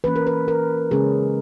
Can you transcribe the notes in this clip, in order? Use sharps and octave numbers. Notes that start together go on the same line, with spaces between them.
E3 A#3 C#4 B4
A#4
B4
A#4
C#3 G#3 C#4 G#4